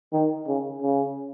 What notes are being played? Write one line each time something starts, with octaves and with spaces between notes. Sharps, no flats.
D#3
C#3
C#3